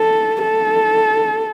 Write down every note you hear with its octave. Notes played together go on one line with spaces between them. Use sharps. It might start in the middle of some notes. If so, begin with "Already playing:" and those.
Already playing: A4
A4